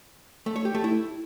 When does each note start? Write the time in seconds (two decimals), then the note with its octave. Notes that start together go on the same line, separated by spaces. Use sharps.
0.46 A3
0.56 C#5
0.65 G4
0.75 A3
0.84 E4